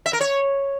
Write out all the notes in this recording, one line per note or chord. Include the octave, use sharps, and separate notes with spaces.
E5
A#4
C#5